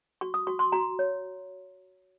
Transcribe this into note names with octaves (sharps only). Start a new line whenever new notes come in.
F#4 C#6
D#6
F#4 C#6
C6
F#4 A#5
C#5